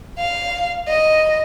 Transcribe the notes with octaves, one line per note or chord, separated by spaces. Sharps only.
F5
D#5